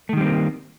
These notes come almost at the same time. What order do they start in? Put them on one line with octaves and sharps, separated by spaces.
A3 D#3 G3 C4 A#3